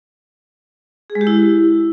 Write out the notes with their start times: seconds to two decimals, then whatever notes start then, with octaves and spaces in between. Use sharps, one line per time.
1.10 G#4
1.15 G#3
1.21 G4
1.27 E4